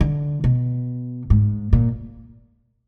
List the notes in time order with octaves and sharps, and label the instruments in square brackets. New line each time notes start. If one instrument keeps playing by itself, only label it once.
[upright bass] D3
B2
G#2
A#2